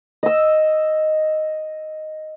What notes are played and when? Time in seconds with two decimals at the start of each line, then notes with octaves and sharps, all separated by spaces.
0.23 D#5 E6